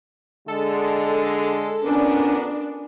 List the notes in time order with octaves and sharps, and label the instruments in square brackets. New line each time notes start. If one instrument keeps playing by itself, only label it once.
[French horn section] D3 G#3 [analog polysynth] A4
[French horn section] F2 B3 A#4 [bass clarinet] C#4 [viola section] D4